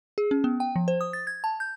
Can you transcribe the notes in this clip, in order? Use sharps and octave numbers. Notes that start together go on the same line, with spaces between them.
G#4
C#4
B3
G5
F3
C5
D#6
A6
G#6
A5
G6